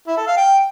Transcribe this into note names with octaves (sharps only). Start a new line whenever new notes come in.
E4
A4
F5
G5